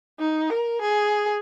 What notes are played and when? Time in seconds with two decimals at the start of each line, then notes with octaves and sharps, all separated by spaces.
0.19 D#4
0.50 A#4
0.81 G#4